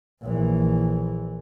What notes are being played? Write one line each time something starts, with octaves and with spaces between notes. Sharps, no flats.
A#1 E3